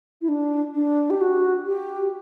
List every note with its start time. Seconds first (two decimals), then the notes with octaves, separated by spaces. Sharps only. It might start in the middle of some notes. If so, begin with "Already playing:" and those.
0.22 E4
0.28 D4
0.74 D4
1.10 G4
1.21 F#4
1.67 G4